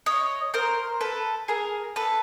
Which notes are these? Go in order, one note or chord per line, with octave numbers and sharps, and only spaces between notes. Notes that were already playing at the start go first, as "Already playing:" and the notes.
C#5 D#5
A#4 C5
A4 B4
G#4 A#4
A4 B4